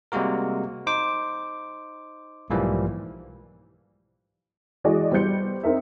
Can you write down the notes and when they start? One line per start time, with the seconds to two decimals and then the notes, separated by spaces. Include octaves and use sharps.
0.12 C3 G3 G#3 A#3 F#4 A#4
0.87 D#4 C5 D6
2.50 B1 G#2 E3 F3 G3 A#3
4.84 E3 G#3 F#4 G#4 D5 D#5
5.12 G3 B3 C5 G6 C#7
5.63 C4 D#4 A#4 E5